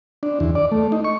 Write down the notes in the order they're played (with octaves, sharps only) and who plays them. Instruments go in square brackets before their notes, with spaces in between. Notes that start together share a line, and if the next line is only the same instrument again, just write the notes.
[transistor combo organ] D4
E2
D5
A3
D#4
C#6